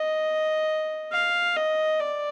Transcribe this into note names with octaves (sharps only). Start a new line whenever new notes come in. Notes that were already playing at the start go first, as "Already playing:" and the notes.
Already playing: D#5
F5
D#5
D5